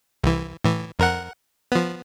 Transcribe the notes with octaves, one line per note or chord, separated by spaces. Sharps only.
C2 E3
A2 E3
F2 A#4 F#5
F3 B3